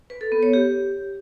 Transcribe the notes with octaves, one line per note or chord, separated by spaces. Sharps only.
B4
A4
B3
C#5
G4